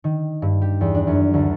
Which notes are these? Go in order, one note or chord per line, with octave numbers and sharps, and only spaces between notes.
D#3
G2
G4
E2
D4
F#2
D2